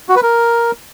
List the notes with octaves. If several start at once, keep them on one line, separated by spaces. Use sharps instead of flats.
F#4
B4
A#4